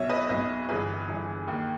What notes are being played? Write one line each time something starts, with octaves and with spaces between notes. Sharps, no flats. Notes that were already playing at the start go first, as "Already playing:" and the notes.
Already playing: B1 B2 C#5 E5
B4 D#5
B1 B2 B4 D#5
G1 G2 E3 G#4 B4
G1 G2 E3
D#2 D#3